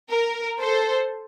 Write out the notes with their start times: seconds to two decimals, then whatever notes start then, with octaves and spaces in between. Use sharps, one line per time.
0.11 A#4
0.60 A4 C5